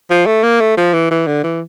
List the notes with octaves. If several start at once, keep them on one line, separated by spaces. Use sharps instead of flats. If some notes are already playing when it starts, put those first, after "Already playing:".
F3
A3
A#3
A3
F3
E3
E3
D3
E3